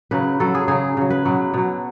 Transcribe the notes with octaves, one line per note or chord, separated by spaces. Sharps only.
C#3 F#3 B4
C#3 F#3 A4
G#4
C#3 F#3 G#4
C#3 F#3
B4
B2 F#3
B2 F#3